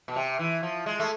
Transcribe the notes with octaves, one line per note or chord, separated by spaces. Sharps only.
B2
C3
E3
F3
G#3
A3